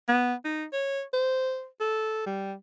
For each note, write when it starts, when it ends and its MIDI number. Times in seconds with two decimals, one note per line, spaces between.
0.08 0.34 59
0.45 0.65 63
0.73 1.02 73
1.13 1.67 72
1.80 2.22 69
2.26 2.54 55